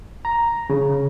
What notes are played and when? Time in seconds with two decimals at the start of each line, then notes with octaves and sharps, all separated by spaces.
0.25 A#5
0.70 C#3